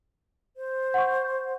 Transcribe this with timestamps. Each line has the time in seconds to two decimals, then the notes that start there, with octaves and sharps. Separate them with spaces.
0.57 C5
0.94 F#5 C#6